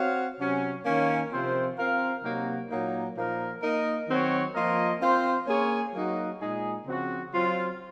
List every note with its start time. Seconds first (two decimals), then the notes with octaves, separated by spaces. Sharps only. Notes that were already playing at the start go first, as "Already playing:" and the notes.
Already playing: C4 F#4 C#5 F5
0.38 C3 F#3 C#4
0.85 D#3 A#3 C#4
1.31 C3 F3 C4 F4 C5
1.77 C4 F4 A#4 F5
2.23 C3 F#3 A#3 D#4 F#4
2.69 A#2 F#3 A#3 D#4
3.15 A#2 F3 A#3 D#4 A#4
3.62 A#3 D#4 A#4 D#5
4.08 D#3 F#3 C4 F#4 C#5
4.54 F3 A#3 F4 A#4 D#5
5.00 C4 F4 C5
5.47 A#3 C#4 G#4 C#5
5.93 F#3 A#3 D#4 F#4
6.39 A#2 G#3 D#4 G#4
6.85 C#3 F3 C4 F#4
7.31 F#3 C4 F4